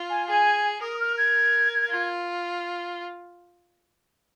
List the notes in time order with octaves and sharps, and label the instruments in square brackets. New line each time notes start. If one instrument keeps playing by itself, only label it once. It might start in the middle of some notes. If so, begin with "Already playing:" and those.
Already playing: [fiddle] F4
[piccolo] G#5
[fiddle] G#4 [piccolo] G#5
[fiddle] A#4 [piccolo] D#6
[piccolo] F6
G#6
[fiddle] F4